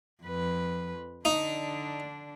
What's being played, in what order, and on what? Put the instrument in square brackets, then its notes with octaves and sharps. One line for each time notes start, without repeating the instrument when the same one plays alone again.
[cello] F2 B4
[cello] D3 D4 [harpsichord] D#4